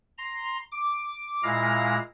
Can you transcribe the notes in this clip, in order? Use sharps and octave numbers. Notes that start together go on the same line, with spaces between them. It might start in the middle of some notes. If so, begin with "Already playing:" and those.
A#5 C6
D6
A#2 G#3 E4 F5 A#5 A#6